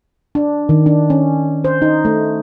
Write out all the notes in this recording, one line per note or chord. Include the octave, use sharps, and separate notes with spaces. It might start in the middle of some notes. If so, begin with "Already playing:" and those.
D4
D#3
D4
C#4
C5
D#4
A3